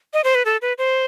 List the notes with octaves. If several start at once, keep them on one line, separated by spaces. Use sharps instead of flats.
D#5
C5
B4
A4
B4
C5